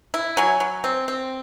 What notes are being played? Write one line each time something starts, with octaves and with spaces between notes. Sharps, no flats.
E4
F#3 G#5
F#3
C4
C4